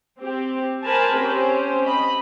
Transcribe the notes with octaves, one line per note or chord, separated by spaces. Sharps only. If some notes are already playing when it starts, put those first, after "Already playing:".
C4 G4
A#4 C5 G#5 A5 B5
C4 C#4 G4 C5
D#5 B5